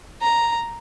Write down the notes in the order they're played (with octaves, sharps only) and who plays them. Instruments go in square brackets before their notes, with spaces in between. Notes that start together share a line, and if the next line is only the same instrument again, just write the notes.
[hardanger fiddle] A#5